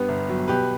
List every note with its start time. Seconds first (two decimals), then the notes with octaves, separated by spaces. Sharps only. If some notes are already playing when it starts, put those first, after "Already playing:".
Already playing: G2 B3 G4 B4
0.08 G1
0.29 F#3
0.48 B2 G4 B4